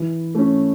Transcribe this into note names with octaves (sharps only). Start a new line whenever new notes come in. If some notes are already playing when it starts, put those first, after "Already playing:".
Already playing: E3
A3 C#4